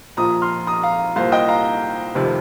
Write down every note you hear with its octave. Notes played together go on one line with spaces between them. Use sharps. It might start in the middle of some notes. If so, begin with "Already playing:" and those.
A#1 A#2 F3 A#5 D#6
C6 F6
A#5 D#6
F5 A#5
C2 A#2 A#3 C5 F5
D#5 G5
F5 A#5
F1 F2 C3 D#3 C4